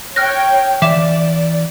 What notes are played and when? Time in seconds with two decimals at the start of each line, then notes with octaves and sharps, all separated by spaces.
0.16 C#5 G5 F6 F#6 A#6
0.82 E3 D5 E5 F5 D6 E7